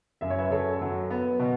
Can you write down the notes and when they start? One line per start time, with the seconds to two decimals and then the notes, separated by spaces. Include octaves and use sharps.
0.21 F#2 E5
0.30 C#5
0.38 B4 E5
0.50 F#2 A4 C#5
0.81 F#3
1.11 B3
1.39 B2